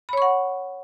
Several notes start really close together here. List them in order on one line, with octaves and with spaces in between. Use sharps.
B5 C#5 C#6 F#5